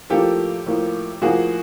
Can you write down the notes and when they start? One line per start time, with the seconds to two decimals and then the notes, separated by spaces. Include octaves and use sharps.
0.10 A2 F3 A#3 G4 A4
0.66 A2 F3 A#3
1.22 A2 F3 A#3 F#4 G#4